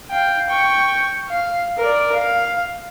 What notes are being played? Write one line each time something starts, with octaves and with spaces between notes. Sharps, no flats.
F5 G5
G5 C#6
F5
A#4 D5
F5